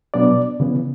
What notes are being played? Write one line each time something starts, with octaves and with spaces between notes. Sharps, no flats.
B2 F#3 B3 D4 D5
C#3 E3 B3